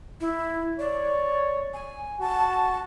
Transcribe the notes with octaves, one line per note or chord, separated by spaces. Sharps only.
E4
C#5 D5
G#5
F#4 A5